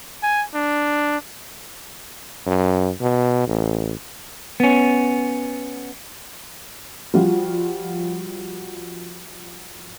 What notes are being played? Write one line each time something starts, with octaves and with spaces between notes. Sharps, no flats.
G#5
D4
F#2
B2
A1
B3 C#4
F3 G3 F4 F#4